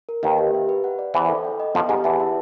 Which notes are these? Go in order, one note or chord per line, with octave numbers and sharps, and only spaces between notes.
A#4
D#2 D#3 B4
G4
E5
B4
F#5
D5
E2 E3 C5
A4
G5
D#5
F2 F3 B3
G#2 G#3 G4
E2 E3 A5
E5